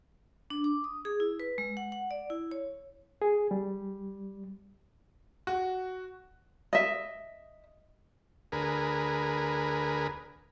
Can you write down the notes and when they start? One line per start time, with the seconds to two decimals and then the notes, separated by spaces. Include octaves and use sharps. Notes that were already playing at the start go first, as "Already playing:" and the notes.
0.50 D4
0.64 D6
0.84 D#6
1.05 G#4
1.20 E4
1.40 B4
1.58 G#3
1.77 F#5
1.92 F#5
2.11 D5
2.30 E4
2.51 C#5
3.22 G#4
3.51 G3
5.47 F#4
6.73 D#5 E5
8.52 D2 G#4 A#4 B4